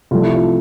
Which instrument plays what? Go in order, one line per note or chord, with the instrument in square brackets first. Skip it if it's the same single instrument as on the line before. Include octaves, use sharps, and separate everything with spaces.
[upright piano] C2 C3 F3 A3 F4
E4
F4